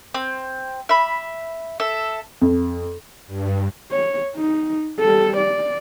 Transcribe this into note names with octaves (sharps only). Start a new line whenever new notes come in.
C4
E5 B5
A4 E5
F2
G2
C#5
D#4
G3 A4
D5